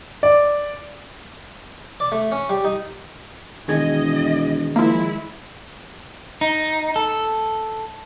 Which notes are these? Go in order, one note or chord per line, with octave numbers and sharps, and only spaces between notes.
D5
D5
A3
C#4
G3
D#4
E1 D#3 G#4 D#5 G#6
F3 G#3 A#3 E4
D#4
A4